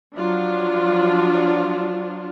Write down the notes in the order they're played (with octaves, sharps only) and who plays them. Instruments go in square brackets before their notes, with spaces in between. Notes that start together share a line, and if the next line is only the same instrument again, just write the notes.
[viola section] F3 F#3 D4 F4